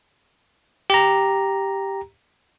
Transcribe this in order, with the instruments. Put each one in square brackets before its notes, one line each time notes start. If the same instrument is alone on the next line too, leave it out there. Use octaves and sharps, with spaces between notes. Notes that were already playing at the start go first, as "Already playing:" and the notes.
[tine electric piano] G4 A#5